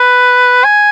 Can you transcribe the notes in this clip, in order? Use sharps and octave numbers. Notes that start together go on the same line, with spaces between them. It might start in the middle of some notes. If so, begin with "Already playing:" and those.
Already playing: B4
G#5